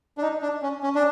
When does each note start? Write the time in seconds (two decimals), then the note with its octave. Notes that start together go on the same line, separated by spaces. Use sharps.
0.18 D4
0.22 D#4
0.42 D4
0.62 C#4
0.83 C#4
0.95 D4